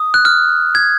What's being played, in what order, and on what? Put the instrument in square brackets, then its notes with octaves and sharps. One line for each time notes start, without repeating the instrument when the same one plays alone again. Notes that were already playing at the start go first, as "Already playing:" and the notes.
Already playing: [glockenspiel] D#6
F#6
F6
G#6